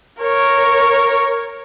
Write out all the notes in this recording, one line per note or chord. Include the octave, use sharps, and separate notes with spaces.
A#4 C#5